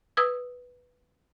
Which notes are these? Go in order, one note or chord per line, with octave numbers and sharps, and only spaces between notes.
B4 D#6 E6 G#6